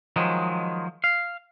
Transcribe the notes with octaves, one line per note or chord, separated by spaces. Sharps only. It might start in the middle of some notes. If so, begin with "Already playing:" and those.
D#3 F3 F#3 G#3
F5